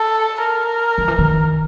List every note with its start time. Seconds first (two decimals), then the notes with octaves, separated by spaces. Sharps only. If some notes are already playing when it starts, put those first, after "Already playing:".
Already playing: A4
0.43 A#4
0.98 D#3
1.08 E3
1.18 D#3